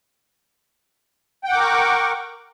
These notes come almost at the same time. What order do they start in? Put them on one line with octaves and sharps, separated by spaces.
G5 F#5 D6 A#4 C#6